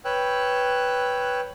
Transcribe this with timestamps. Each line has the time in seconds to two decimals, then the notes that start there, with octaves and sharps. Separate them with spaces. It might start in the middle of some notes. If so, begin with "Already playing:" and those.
0.05 B4 C#5 G5 E6 F#6